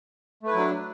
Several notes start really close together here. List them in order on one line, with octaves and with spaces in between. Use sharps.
A3 B4 E4 F#3 D4